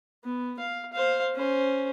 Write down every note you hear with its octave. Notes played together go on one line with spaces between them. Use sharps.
B3
F5
C5 F5
C#4 C5